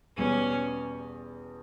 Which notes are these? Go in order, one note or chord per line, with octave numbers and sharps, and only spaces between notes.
E2 B2 G3 B3 C#4